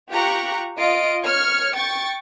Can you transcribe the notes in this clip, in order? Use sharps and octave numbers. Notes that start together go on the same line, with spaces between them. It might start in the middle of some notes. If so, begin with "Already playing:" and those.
F4 G4 A#5 C#6 F#6
F4 D#5 D7
C#5 F6 G#6 C#7
G5 C#6 A6